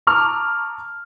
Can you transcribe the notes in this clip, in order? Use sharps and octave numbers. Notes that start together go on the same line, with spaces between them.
A5 A#5 C#6 D6 E6 F6